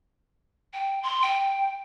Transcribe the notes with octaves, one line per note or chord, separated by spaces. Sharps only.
G5
C6
G5